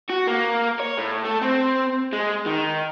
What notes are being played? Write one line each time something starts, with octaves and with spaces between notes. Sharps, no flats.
F#4
A#3
C#5
A2
A3
C4
G#3
D#3